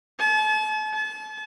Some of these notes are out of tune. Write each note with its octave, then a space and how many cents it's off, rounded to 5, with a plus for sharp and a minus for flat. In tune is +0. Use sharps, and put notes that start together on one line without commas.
A5 -40
A5 -40